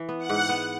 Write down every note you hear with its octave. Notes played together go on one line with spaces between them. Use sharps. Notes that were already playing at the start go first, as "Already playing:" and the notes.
Already playing: E3
B3
F#5
G#2
B3